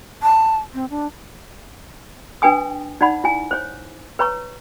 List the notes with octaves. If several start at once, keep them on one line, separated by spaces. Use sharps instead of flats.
A5
C4
D4
D4 B4 G5 G#5 D#6
D#4 D5 F#5 B5
E4 G#5
C5 C#5
B4 C#5 A#5 C#6